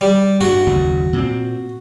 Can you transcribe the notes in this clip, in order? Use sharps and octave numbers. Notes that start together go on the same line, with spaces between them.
G3
G2 F#4
F#1 D#2
A#2 C4